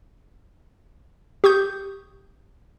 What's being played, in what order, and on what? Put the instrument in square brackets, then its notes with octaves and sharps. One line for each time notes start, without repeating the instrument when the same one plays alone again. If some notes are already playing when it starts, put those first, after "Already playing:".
[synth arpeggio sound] G4 C#6 D#6 G6